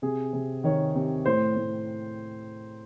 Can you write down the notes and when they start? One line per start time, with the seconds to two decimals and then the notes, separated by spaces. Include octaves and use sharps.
0.02 C3 G#4
0.33 C3
0.64 D#3 C#5
0.95 C3
1.26 A2 C5
1.56 A2